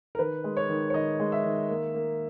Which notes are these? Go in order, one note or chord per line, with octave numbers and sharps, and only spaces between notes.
A#4
D#3 B4
G#3
C#5
D#3
C#5
D#3 D#5
G#3
E5
D#3
A#3
A#3